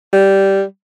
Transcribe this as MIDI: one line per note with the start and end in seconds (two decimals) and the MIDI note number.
0.13 0.64 55